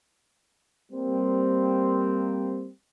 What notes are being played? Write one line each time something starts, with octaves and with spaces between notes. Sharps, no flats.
G3 A#3 C4